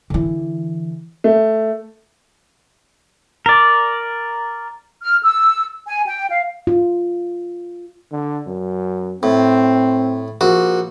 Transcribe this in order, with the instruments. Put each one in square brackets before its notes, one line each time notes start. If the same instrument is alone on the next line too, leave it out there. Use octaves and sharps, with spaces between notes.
[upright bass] D3 E3
[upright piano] A3
[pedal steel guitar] A#4 D5
[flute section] F6
E6
G#5
G5
F5
[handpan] F4
[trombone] D3
F#2
[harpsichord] A2 [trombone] C4
[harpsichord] A#1 F#4